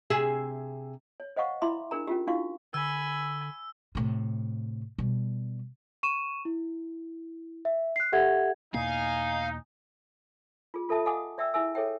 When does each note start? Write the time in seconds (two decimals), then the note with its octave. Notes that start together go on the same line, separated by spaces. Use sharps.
0.10 C3 G#4 E5
1.20 C#5
1.36 C5 D#5 F5 F#5 C#6
1.62 E4 E5 B5 C6 D6
1.91 D4 G#4 A#4 A#5
2.07 C#4 F4 G4
2.27 D4 E4 F#4 F5 C#6
2.74 D3 G#5 B5 E6
3.95 A2 C3
4.98 B2 G3
6.03 C#6 D#7 E7
6.45 E4
7.65 E5
7.96 F#6 C7
8.12 G4 A4 E5 F#5 G#6
8.74 E2 B2 A#3 D#4 F5 G#5
10.74 F4 G#4
10.89 F4 A4 E5 A5 D#6
11.05 D#5 F5 F#5 G#5 D6 D#6
11.38 D5 E5 G5 E6
11.54 E4 G#4 E5 G#5 E6
11.75 G#4 A4 C#5 E5 G5